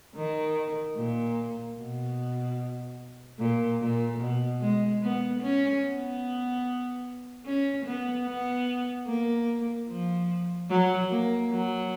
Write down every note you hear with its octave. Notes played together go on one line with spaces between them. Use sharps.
D#3
A#2
B2
A#2
A#2
B2
G#3
B3
C#4
B3
C#4
B3
B3
A#3
F3
F#3
A#3
F#3